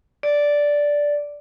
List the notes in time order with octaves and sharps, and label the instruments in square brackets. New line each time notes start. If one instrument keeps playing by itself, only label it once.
[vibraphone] D5